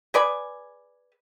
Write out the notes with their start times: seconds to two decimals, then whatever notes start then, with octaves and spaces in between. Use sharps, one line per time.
0.14 G#4 B4 D5 G#5